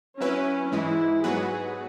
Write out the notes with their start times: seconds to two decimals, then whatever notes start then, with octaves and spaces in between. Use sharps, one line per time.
0.21 F#3 C#4 E4 B4
0.72 G#2 E3 G#3 E4
1.24 G#2 F#3 B3 F#4 G#4 B4